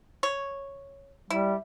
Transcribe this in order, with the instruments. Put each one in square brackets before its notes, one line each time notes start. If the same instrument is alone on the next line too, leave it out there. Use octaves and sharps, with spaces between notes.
[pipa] C#5
[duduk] G3 [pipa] E4